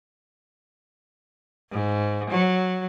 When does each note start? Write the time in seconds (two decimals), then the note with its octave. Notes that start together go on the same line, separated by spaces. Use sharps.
1.71 G#2
2.30 F#3